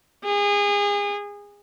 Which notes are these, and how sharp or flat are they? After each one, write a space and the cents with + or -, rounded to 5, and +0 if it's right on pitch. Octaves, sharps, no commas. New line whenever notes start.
G#4 -30